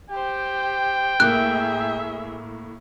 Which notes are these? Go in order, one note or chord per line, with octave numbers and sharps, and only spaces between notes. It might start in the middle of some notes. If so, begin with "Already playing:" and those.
G4 C5 G5
A2 A#3 G#4 E5 F#6